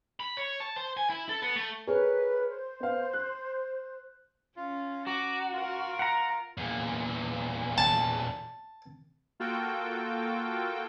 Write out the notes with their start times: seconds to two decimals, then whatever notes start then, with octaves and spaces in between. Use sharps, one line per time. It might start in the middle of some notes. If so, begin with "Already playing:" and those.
0.20 B5
0.37 C#5
0.60 A5
0.76 C5
0.97 G#5
1.10 E4
1.29 A4
1.42 B3
1.56 A3
1.87 G#4 A#4 B4 C#5
2.48 C5
2.80 B3 F5
3.13 F#6
4.56 C#4 F4
5.07 F#4 A#5 D6
5.53 F4 A#4
5.99 F#5 A#5
6.57 E2 A#2
7.78 A5
9.40 A#3 F4 F#4 A4 G5